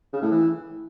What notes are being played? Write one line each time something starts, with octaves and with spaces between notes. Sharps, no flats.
C#3
A2
E3